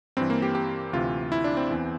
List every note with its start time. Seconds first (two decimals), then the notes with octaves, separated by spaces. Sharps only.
0.17 G2 E3 C4
0.30 A#3
0.42 G4
0.55 G4
0.93 D2 C3 E3 F4
1.32 E4
1.44 D4
1.57 C4
1.70 E2 E3